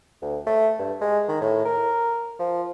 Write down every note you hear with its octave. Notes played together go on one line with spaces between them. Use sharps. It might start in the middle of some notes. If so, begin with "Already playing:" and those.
D2
A3
G2
G#3
D#3
A2
A#4
F3